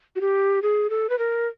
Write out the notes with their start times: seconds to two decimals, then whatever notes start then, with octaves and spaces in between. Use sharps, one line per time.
0.16 F#4
0.21 G4
0.62 G#4
0.90 A4
1.10 B4
1.19 A#4